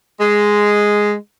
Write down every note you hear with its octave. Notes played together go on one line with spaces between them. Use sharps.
G#3